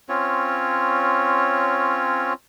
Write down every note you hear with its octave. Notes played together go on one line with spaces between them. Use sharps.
C4 C#4 F4 C#5